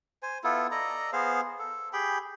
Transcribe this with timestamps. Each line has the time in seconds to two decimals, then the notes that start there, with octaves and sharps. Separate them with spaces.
0.23 C5 G#5
0.44 B3 E4 F4 A4
0.71 A4 D5 D#5 A#5
1.13 B3 G#4 C5 F5
1.59 A4
1.93 G4 G#4 G5 B5